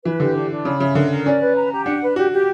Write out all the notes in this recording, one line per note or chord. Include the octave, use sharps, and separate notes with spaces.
E3 B4
D3 G4
D4
D4
C#3 B5
C#3 E5
D3 A#4
A#4
C#4 D5
B4
A#5
G4
D4 F#5
B4
F#4 G4
G4